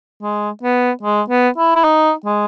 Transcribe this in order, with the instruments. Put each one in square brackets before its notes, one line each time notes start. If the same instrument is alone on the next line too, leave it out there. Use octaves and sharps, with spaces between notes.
[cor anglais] G#3
B3
G#3
B3
E4
E4
D#4
G#3